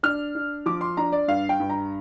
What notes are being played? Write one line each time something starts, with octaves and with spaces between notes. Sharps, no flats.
D4 F6
D4
F3 D6
C6
D4 A#5
D5
G2 F5
G5
G2
A#5